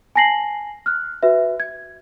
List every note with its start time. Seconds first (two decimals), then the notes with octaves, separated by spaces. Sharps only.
0.15 G#5 A5 A#6 C7 F#7
0.86 F6 F#6
1.23 F#4 B4 E5
1.60 G#6